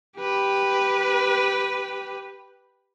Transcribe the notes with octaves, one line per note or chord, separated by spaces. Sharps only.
G4 B4